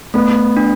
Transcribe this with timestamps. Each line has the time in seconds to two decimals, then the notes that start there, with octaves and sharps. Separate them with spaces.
0.14 A3 B3
0.57 D4